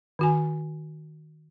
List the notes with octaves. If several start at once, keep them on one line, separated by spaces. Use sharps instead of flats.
D#3 F#4 G#5